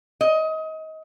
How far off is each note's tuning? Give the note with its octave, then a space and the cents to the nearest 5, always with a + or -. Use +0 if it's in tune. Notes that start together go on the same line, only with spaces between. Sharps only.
D#5 +25